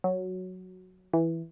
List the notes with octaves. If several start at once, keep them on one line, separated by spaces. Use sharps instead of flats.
F#3
E3